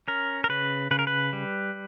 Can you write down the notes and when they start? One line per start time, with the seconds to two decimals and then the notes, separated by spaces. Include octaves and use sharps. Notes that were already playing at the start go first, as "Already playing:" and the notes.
0.08 C#4 A#4
0.44 A#4
0.49 C#3 B4
0.91 C#3 B4
0.99 A#4
1.07 B4
1.33 G3